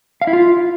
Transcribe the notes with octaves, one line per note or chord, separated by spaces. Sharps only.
F5
E4
F4